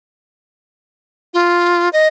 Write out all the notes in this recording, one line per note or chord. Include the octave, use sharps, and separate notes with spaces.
F4
D#5